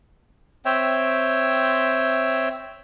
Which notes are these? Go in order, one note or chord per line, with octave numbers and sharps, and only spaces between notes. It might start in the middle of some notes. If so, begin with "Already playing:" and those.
C4 C#5 E5 G5